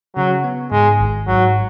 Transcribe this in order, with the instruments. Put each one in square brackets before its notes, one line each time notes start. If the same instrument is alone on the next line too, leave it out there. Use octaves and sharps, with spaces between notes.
[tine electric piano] C#3 [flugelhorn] F#3
[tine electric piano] B3
[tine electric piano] G#2 [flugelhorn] G#3
[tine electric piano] G#1
[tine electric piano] G#2 [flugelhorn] F#3